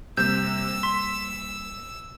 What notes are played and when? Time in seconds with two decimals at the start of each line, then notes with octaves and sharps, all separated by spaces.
0.17 F2 C3 G3 A#3 E6 G6
0.83 C6 B6